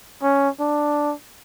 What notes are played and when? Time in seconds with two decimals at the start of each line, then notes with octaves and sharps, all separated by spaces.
0.23 C#4
0.60 D4